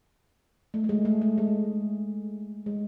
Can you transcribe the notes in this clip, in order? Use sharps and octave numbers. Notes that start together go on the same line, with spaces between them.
A3
A3
G#3
A3
A3
G#3
G#3